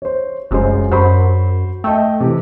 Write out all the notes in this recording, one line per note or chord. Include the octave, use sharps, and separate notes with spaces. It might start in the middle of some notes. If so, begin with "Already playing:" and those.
C5 C#5
F1 F#2 G#3 C5
F#2 F#4 C5 B5
A3 D#5 G5
C3 E3